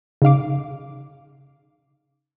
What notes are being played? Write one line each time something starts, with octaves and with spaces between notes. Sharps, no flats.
C#3 D#4 F5 D6